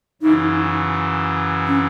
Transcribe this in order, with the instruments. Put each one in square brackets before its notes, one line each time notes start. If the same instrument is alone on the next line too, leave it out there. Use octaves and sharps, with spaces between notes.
[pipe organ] F#2 C#3 E3 [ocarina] D#4
[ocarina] C#4